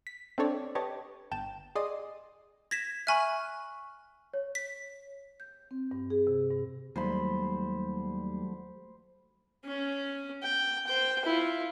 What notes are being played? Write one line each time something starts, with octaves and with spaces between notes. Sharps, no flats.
B6
C4 D4 A4 C#5 D5
G4 B4 C#5 D#5 A5
G1 G5 A5 E7
G#4 D5 D#5 C6 D#6
G#6 A#6 B6 E7
E5 G#5 B5 C#6 F6 F#6
C#5
B6
G6
C4
G2
G#4
C3
G2
D#2 F#3 G3 A3 C5 B5
C#4
G5
C5 G5
E4 F4